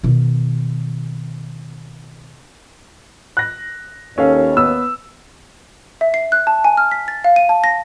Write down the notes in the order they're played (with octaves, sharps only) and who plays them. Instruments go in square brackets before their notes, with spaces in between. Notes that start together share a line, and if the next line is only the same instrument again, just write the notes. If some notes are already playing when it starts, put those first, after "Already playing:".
[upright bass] B2 D#3
[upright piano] F#6 A#6
[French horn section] D#2 C#5 [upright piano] C#4 A4 F5
[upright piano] B3 E6
[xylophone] E5
C7
F#6
A5
G#5
F6
B6
A6
F5
D#7
A5
A#6